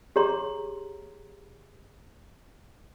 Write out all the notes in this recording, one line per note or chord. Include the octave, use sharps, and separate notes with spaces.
G4 G#4 C#5 A#5 C6